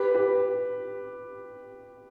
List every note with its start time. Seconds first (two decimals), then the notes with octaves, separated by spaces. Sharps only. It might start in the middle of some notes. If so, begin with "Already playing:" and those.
Already playing: G4 B4
0.14 G4 B4